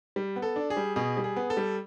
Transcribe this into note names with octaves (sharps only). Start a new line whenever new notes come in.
G3
B3
A4
D4
G#4
G3
B2 G#4
G3
G#4
B3
A4
G3